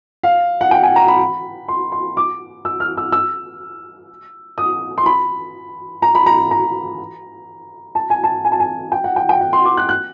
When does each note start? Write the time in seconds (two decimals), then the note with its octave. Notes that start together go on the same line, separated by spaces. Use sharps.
0.23 F5
0.61 F#5
0.71 G5
0.83 G#5
0.96 A#5
1.08 B5
1.68 C6
1.92 C6
2.17 D6
2.65 E6
2.80 F6
2.97 E6
3.12 E6
4.58 D#6
4.98 C6
5.06 B5
6.02 A#5
6.15 B5
6.26 A#5
6.51 A#5
7.95 A5
8.10 G#5
8.24 A5
8.45 G#5
8.52 A5
8.60 G#5
8.92 G5
9.04 F#5
9.16 G5
9.29 G5
9.41 F#5
9.53 C6
9.65 D6
9.77 F#6
9.89 F#6